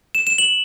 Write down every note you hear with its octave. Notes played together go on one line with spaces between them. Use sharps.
E7
E7
F#7